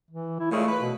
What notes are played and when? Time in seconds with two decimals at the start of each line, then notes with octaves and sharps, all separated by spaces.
0.10 E3
0.39 E4
0.51 A#2 C#3 G#3 A3
0.67 B4
0.81 B2